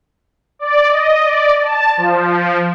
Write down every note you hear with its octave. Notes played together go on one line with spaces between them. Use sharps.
D5
D#5
D5
A5
F3